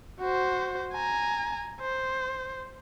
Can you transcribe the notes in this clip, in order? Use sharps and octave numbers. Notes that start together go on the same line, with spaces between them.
F#4 C5
G#5 A#5
C5